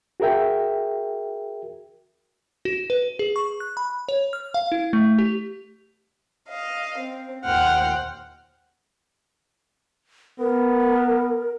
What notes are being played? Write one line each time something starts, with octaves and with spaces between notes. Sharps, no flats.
F#4 G#4 A#4 E5 G5
F#4
B4
G#4
C#6
F#6
B5
C#5
F6
F5
E4
A3
G4
D#5 F5
C4
D#2 A#2 C5 F#5 G5 F6
B3 A#4